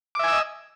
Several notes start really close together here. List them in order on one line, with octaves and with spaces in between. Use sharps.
D6 E5 G#5 E6 D#5